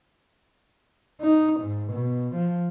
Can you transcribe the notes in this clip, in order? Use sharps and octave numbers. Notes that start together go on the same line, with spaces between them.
D#4
G#2
B2
F3